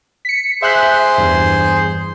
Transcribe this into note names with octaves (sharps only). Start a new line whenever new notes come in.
B6 C#7
G#4 C5 E5 C6 F#6 B6
E2 G2